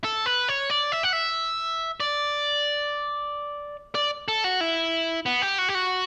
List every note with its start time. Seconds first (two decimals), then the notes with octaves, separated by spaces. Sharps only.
0.04 A4
0.26 B4
0.49 C#5
0.70 D5
0.92 E5
1.03 F#5
1.13 E5
2.00 D5
3.95 D5
4.28 A4
4.44 F#4
4.61 E4
5.26 B3
5.42 G4
5.58 F#4
5.69 G4
5.75 F#4